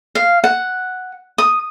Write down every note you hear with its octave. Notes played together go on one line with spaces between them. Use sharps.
F5
F#5
D#6